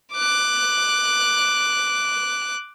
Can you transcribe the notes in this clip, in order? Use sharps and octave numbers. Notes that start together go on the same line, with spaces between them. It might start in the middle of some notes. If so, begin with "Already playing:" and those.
D6 F#6